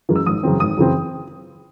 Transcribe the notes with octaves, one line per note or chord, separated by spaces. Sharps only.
F#2 E3 G#3 C#4
E6
G#1 D#6
F#2 C#3 E3 C4
G#1 D#6
F#2 C#3 E3 C4